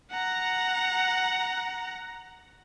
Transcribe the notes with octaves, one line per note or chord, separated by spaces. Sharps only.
F#5 A#5